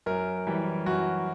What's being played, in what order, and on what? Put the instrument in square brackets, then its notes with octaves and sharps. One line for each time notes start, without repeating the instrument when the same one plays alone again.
[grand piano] F#2 A#4
E3 G3
F#2 F#4